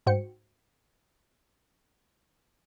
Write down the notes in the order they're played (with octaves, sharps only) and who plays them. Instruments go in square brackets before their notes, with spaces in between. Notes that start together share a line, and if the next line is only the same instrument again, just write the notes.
[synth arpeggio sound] G#2 F#4 C5 G5 C#7